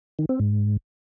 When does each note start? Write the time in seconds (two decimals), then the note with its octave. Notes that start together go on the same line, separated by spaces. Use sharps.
0.19 D#3
0.29 C4
0.40 G#2